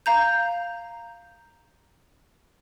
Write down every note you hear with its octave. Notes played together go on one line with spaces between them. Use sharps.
F5 A#5 G6